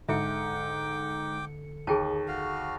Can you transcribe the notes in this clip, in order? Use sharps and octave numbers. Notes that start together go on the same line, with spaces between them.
G#2 D3 A4 E5 G5 D6 C#7
D#2 G#4 G5 A5
F#4 F5